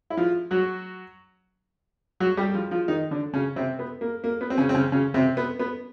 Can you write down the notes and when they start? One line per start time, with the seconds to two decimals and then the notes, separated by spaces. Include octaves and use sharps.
0.10 E4
0.17 F3 F4
0.51 F#3 F#4
2.20 F#3 F#4
2.37 G3 G4
2.54 F3 F4
2.71 F3 F4
2.88 D#3 D#4
3.11 D3 D4
3.33 C#3 C#4
3.56 C3 C4
3.79 B3
4.01 A#3
4.24 A#3
4.41 B3
4.50 C4
4.58 C#3 C#4
4.69 C4
4.75 C#3 C#4
4.92 C#3 C#4
5.14 C3 C4
5.37 B3
5.59 B3